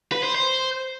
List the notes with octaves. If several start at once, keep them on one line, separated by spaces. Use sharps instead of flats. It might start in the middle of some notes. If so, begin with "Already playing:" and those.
B4
C5
C5